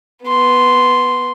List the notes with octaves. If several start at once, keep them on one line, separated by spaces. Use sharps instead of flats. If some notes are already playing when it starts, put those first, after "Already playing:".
B3 C6